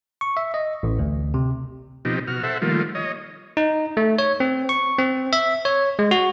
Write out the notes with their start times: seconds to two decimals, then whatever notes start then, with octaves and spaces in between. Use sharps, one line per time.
0.21 C#6
0.37 E5
0.54 D#5
0.83 A1
0.99 D2
1.34 C3
2.05 B2 F3 C4 D#4 G4
2.27 B2 F#4 F6
2.43 A4 C5 E5 F#5
2.62 D#3 F3 G3 A3 A#3 F4
2.95 C#5 D#5
3.57 D#4
3.97 A3
4.18 C#5
4.40 C4
4.69 C#6
4.99 C4
5.33 E5
5.65 C#5
5.99 G#3
6.11 F#4